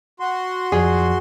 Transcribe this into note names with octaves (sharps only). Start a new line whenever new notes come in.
F#4 C6
F2 F3 G#4 D5